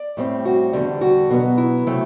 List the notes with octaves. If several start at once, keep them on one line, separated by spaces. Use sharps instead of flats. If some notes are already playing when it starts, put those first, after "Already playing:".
Already playing: D5
A2 G3 C4
F#4
E2 D3 G3
F#4
B2 F#3 B3
E4
C3 F#3 A3 C4